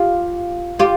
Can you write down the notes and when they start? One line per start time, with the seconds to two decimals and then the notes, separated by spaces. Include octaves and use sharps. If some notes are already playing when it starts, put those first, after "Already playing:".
Already playing: F4 G4
0.79 F4 G4